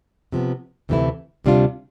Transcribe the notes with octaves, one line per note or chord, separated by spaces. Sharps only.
C3 F3 B3
D2 C3 E3 A3 E4
D2 C3 G3 D4 F4